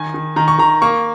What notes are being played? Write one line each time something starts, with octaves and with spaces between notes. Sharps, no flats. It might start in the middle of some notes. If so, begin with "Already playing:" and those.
Already playing: D#3 G#5
D#3
D#3 A#5
C#6
D#3 A#5
A#3 C#6